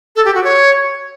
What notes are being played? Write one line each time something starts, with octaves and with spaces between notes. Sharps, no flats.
A4
G4
F#4
C#5